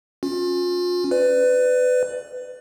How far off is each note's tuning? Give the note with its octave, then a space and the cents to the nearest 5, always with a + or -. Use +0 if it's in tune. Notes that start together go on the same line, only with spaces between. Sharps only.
C#4 +0 F4 +35
B4 +25 D5 +15